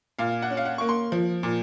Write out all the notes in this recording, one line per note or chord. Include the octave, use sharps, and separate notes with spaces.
A#2 F5
F#5
C#4
F5
F#5
A#3 C#6
C6
F3
A#2